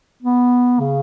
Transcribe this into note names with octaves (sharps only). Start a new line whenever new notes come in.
B3
C#3